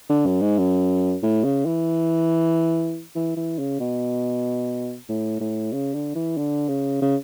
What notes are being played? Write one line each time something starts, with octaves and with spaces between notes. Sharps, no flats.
D3
F#2
G#2
F#2
A2
C#3
E3
E3
E3
C#3
B2
A2
A2
C#3
D3
E3
D3
C#3
C#3